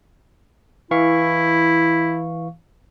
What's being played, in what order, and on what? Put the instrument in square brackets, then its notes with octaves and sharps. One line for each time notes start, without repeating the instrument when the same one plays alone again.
[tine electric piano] E3 F5 C#6 [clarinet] E4